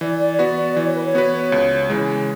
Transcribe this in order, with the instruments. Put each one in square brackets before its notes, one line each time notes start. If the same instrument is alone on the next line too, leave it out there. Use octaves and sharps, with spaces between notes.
[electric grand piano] E3 [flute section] D5
[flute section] D5
[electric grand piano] B3 F#4 B4 [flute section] D5
[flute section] D5
[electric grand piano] E3 [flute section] D5
[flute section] C#5
B4
C#5
[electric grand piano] B3 F#4 B4
C#2
C#3 E3 G#3